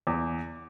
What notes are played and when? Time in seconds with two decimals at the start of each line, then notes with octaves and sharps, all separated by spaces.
0.07 E2